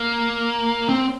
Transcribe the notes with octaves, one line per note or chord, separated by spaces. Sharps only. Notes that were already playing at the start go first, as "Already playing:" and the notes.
Already playing: A#3
C4